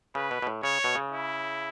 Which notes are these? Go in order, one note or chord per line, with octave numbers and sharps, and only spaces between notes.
C#3 B4
B2
B2
A2
C#3 C#5
B2
C#3
E4